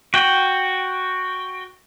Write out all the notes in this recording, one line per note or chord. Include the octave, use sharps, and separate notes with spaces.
F#4 G5